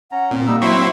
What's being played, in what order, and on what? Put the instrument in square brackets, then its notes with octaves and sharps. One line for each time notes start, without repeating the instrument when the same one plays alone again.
[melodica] C#4 A#5 [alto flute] F#5
[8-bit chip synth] A#2 [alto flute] C4
[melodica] G3 D#4 E6 [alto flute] A#3
[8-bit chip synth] F#3 C4 E5 [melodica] E4 C6 C#6